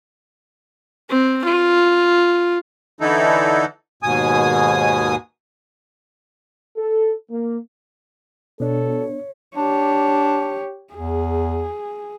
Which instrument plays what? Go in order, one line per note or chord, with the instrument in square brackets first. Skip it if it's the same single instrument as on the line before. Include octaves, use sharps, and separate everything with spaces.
[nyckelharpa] C4
F4
[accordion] D3 E3 D#4 E4 A4
D#2 G#2 B2 G#5 D#6
[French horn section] A4
A#3
[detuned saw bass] B2 [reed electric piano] B3 D4 [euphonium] A4 [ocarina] C#5
[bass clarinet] D4 [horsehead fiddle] G4 C#5
[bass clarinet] E2 [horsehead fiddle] G#4